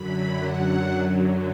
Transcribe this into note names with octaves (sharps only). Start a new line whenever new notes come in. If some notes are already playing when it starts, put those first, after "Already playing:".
Already playing: F#2 D3 F#3 B5
F#5